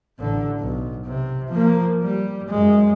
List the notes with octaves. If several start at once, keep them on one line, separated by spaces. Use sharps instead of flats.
A1 D3
B1
C3
F3 A#3
G3
F#2 G#3